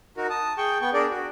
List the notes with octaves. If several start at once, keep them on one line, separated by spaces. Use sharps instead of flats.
D#4 F#4 A#4
A5 D#6
G#4 G5 C#6 G6
B3 G5 C#6
D4 G#4 A#4 D5
F#4